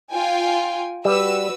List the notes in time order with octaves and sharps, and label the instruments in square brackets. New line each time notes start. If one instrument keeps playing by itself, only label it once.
[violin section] F4 G5 G#5
[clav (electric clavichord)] G3 [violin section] F#4 B4 E6